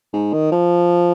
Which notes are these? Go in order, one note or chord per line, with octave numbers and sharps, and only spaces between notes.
G#2
D#3
F3